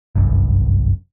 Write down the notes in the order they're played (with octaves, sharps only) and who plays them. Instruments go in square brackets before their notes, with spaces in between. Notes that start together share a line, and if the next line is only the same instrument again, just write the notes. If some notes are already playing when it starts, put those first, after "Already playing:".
[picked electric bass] G1 C2 F#2